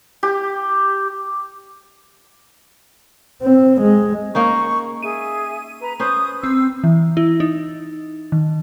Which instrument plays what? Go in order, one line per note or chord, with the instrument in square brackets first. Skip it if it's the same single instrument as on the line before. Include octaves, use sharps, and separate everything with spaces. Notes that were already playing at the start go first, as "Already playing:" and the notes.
[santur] G4
[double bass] C4
G#3
[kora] A#3 C#4 D#4 [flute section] C#6
[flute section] G#4 E5 [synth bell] D#7
[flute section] B4 A#5
[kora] C#4 B4 C5 [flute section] D#6 G6
[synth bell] C4 [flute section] E6
[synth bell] E3
E4
D#4
D#3